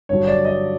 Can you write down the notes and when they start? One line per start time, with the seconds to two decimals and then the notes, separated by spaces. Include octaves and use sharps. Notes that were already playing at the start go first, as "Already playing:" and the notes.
0.09 G2 D3 F#3 C#5
0.28 D5
0.45 D#5